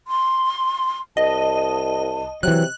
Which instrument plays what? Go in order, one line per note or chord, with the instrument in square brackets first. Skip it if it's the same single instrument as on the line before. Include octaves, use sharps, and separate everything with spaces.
[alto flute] C6
[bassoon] C2 [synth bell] D#5 [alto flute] A5
[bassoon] C3 [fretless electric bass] E3 F#3 [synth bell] F#6